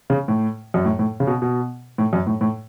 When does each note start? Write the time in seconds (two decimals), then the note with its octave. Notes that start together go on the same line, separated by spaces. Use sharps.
0.10 C#3
0.28 A2
0.74 F#2
0.85 A2
0.99 A2
1.20 C#3
1.27 B2
1.42 B2
1.98 A2
2.13 F#2
2.27 A2
2.41 A2